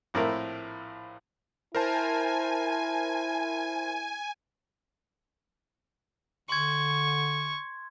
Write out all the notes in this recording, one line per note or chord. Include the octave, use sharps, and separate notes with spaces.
A#1 A2 C4 E4 A#4
E4 A#4 C5 G#5 A5
D3 C6 C#6 G#6